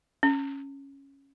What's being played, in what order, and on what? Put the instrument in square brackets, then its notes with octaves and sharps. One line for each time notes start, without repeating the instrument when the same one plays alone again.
[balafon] C#4